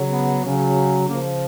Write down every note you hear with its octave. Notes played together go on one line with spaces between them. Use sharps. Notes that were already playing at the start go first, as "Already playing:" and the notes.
Already playing: C#3 F#3
B3
C#3 F#3
C#3 F3 A#3